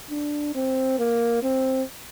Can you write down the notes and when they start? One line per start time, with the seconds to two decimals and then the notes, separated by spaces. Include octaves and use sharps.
0.10 D4
0.55 C4
0.98 A#3
1.43 C4